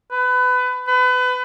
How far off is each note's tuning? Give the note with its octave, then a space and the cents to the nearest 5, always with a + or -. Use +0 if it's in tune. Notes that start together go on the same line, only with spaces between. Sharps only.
B4 +25
B4 +30